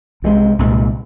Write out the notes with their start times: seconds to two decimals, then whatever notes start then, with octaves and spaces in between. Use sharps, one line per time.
0.22 C2 C3 D#3 G#3
0.59 C2 A#2 G#3